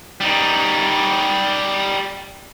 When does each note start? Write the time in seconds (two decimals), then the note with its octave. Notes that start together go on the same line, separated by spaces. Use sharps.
0.20 G3 D#4